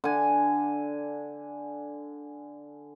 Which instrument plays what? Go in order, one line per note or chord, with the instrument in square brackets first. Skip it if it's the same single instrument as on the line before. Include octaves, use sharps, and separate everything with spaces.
[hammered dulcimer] D3 G#5